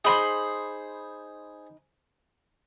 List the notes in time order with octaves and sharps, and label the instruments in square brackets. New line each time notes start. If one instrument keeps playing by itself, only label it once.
[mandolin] D#4 B5 C6 [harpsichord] G#4 C5